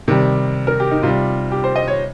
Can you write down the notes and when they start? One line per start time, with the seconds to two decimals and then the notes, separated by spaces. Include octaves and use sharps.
0.08 C3 D#3 G3
0.67 A#4
0.80 G4
0.91 D#4
1.03 C3 G3 F4
1.52 G4
1.64 C5
1.76 D#5
1.88 C#5